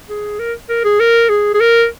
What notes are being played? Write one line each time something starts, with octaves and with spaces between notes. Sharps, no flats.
G#4
A#4
A#4
G#4
A#4
G#4
G#4
A#4